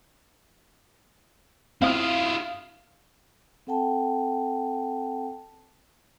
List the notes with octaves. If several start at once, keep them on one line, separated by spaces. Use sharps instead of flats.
C4 E4 F4 F5 D#6 F6
C4 A4 F#5 G5 A5